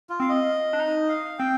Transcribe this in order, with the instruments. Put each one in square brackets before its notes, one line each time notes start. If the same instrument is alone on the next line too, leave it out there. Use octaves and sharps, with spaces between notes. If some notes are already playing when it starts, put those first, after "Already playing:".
[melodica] F4
[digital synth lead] C4 [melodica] F5
[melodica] D#5
[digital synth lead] D4
D#4
[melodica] F5
[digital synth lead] C4 [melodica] G5